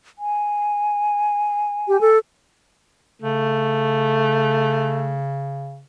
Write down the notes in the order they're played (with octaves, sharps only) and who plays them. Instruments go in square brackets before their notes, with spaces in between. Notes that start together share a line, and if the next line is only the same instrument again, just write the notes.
[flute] G#5
[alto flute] G4
A4
[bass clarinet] C#3 [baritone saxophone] A3